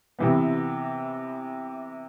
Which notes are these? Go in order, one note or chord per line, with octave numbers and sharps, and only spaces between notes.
C3 E3 B3